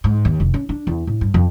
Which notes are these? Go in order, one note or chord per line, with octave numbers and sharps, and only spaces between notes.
G#2
D#2
F1
C#4
D4
E2
A2
G2
F2